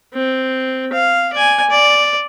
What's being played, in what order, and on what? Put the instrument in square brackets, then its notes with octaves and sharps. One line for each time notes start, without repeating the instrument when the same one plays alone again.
[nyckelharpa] C4
F5
D5 G#5
D5